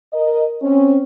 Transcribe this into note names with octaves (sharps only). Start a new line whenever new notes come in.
A#4 D#5
C4 C#4